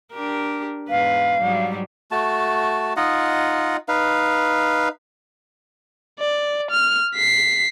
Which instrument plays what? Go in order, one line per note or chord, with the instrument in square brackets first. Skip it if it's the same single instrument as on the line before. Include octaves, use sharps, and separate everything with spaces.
[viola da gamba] D4 G4 A#4
[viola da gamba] E2 G#2 B4 [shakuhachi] F5
[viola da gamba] G#2 F#3 G3
[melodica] A3 F#4 A5
D#4 F4 D#5 F#5
D#4 B4 F5
[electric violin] D5
F6
B6 C7